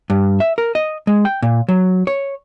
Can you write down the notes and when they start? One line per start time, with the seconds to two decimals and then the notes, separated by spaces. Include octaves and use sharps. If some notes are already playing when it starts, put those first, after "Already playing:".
0.10 G2
0.40 E5
0.58 A#4
0.75 D#5
1.07 G#3
1.25 G5
1.42 A#2
1.69 F#3
2.07 C#5